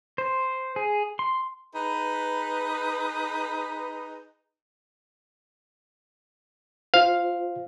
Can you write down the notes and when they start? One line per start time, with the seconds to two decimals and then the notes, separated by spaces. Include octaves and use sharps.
0.18 C5
0.76 G#4
1.19 C6
1.74 D#4 G#4 B4
6.94 F4 C5 F5